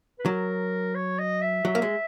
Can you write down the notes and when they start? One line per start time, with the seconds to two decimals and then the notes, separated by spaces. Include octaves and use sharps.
0.19 B4
0.26 F#3 A#4
0.95 C#5
1.18 D#5
1.41 E5
1.65 F#3 E5
1.75 A#3
1.82 G#3